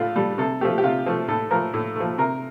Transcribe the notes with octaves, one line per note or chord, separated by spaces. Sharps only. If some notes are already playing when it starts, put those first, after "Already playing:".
Already playing: A2 D4 F4
G3 A4
C3 A4
F3 A3 G4
G4
C3 F4
F3 A3
A2 A4
F3 A3 A#4
A2
F3 A3
C3 A#4